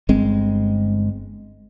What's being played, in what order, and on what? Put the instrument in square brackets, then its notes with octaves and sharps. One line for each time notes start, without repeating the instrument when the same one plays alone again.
[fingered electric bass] G1 G#3 C4